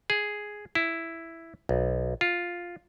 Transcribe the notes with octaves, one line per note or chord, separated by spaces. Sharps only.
G#4
E4
B1
F4